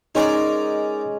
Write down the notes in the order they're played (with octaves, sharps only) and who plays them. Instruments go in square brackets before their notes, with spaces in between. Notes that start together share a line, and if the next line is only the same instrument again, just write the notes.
[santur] G#3 C#4 [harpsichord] D#4 A#4 D5